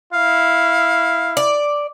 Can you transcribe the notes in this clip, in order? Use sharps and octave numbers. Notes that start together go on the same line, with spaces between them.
E4 F5
D5